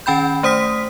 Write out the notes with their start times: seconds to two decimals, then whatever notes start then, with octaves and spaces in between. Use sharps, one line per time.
0.06 D#3 C#4 G5 B5 G6
0.43 A3 C5 D#6 B6